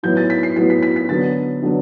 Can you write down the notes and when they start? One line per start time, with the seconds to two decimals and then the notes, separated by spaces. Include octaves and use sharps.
0.03 A2 F#3 B3 E4 G6
0.17 A6
0.30 B6
0.43 C7
0.56 A2 F#3 B3 E4 C7
0.70 B6
0.82 B6
0.96 B6
1.09 D3 F#3 B3 D4 A6
1.62 D3 F#3 B3 D4